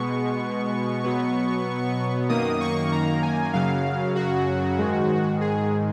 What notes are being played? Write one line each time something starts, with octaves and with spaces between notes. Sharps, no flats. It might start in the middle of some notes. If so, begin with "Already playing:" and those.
Already playing: B2 G#3 B3 C#6
B2 F#3 B3
F#2 D#3 A#3 D#6
C#6
A#5
G#5
F#2 C#3 F#3 F5
F#4
G#2 D#3 G#3
G#4